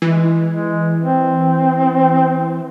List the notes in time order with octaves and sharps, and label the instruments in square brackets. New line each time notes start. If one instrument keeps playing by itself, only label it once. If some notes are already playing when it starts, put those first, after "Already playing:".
[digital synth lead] E3 [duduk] G#3
[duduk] G#3
C4